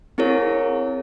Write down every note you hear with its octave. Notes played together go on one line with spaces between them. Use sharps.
C4 E4 G#4 A#4 C#5